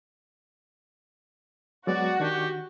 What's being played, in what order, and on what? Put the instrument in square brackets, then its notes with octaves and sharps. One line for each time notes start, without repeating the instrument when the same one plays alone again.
[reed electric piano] F#3 G#3 B3 [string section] F#4 [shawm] D5
[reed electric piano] D#3 D4 [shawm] G4